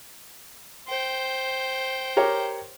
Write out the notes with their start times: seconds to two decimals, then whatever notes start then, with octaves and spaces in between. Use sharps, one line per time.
0.87 C5 G5
2.17 G4 A#4 C#5